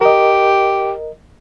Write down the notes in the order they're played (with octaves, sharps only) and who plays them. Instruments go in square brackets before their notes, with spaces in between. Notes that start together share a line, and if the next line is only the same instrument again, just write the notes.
[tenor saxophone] G4 [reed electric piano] A#4 D#5